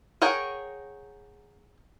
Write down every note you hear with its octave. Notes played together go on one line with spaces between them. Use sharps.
G#4 A#4 C#5 F#5 G5